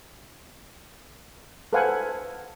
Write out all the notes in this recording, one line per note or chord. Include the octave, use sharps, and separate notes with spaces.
A4 B4 C5 F5 F#5 G#5